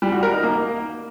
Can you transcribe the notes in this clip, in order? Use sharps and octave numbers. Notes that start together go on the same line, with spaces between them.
G3
F#4
A#4
D#4
A#3